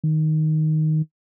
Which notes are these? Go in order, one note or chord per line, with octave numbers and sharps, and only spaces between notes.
D#3